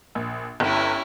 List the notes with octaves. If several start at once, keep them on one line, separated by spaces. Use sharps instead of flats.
A#1
G1 C#4 E4 G4